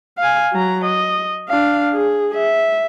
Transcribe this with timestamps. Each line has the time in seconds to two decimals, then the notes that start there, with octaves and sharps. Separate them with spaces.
0.18 F5 G#5
0.53 F#3 A#5
0.85 D#5
1.49 D4 F5
1.93 G#4
2.35 E5